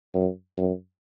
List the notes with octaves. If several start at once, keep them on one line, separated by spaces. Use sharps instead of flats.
F#2
F#2